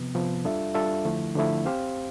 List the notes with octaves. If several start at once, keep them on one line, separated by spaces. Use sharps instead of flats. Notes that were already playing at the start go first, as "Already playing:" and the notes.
Already playing: C3 F3 B3
C3 F3 B3
G3 D4 F4 A4 E5
G3 D4 F4 A4 E5
D3 F3 A3 E4
D3 F3 A3 E4
C4 G4 C5 F5